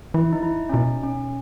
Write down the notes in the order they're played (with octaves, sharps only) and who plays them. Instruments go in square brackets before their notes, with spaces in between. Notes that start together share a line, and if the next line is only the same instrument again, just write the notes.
[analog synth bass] E3 [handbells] E4
[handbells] D#4
E4
C#4
[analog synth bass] B2 [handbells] D#4
[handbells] C#4